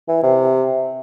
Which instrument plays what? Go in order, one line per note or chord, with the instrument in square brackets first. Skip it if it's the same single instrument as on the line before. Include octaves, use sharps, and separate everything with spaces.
[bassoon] E3
C3